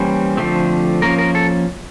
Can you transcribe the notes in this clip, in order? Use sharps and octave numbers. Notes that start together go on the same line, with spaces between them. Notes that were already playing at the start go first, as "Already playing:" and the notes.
Already playing: E3 G3 A#3 C#4 C5
D3 F3 A3 C4
F3 A#3 C#4 A#4
A#4
A4